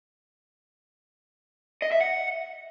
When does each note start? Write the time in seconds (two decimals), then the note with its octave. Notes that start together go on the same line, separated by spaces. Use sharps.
1.82 D#5
1.91 E5
2.01 F#5